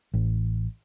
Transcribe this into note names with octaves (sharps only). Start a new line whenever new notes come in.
A1